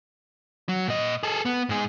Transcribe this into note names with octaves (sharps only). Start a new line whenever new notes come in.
F#3
A#2 D#5
G#4 A4
B3
G#2 G#4